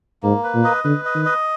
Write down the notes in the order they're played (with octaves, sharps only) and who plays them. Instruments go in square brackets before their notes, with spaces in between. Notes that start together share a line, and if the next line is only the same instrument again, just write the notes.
[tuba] G#2 [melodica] A#3
[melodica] B4
[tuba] A#2
[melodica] D#5
[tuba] D3 [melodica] B4
[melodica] D#5
[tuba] D#3
[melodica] D#5